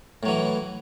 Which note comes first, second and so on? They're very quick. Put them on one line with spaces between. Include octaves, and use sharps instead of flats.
A2 F#3 E3